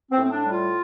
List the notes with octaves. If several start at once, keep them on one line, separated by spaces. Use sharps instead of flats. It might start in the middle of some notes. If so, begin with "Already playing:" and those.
C4
A2
C4
D4
G3
F4